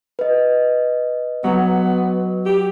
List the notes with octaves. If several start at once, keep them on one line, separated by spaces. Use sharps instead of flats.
B4 D#5
F#3 B3
G4